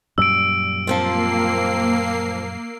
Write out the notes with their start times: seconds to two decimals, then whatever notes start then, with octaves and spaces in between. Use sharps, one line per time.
0.18 F#2 A#2 G3 E6 D7
0.87 F3 A#3 C4 F4 C7